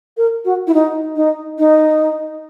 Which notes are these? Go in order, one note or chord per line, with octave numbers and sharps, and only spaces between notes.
A#4
F#4
E4
D#4
D#4
D#4